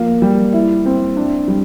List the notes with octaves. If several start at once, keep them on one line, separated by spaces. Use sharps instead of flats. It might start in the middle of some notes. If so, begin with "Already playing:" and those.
Already playing: F3 A#3
G3
E4
C4
D4
G3